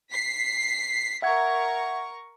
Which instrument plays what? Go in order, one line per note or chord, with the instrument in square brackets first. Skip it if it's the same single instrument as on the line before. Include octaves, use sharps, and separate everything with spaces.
[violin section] B6 C7
[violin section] A#4 C#6 [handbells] E5 F#5 G#6